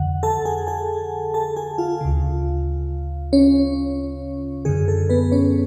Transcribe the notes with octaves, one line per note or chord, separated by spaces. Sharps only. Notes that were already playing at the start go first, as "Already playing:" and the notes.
Already playing: F2 D3 F#5
A4 A5
G#4 G#5
G#4 G#5
A4 A5
G#4 G#5
F4 F5
D2 C#3
C#4 C#5
F#2 D3 G#4
A4
B3 B4
C#4 C#5